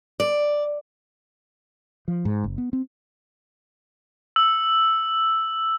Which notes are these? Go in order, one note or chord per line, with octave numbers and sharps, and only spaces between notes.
D5
F3
G#2
F#1
B3
C4
E6